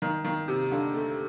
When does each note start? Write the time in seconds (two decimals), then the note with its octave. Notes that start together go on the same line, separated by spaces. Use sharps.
0.02 D#3
0.24 D#3
0.48 C3
0.72 D3
0.94 A3